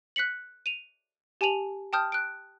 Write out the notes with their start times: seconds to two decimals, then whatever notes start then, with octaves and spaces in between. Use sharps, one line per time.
0.16 F#6 B6 C#7 F#7
0.66 D#7 F7
1.41 G4 G#5 A5 D#7 F7 F#7
1.93 G5 A5 D#6 F6 G6
2.12 F#6 D7